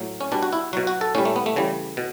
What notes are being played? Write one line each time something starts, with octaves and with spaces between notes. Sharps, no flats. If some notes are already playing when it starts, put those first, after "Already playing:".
Already playing: A2 F#3
C#4
B2 G3 D4
F#4
E4
B2 F#3 F#4
F#4
A4
A2 G3 C#4
A3
B3
A3
C#3 E3 G3
B2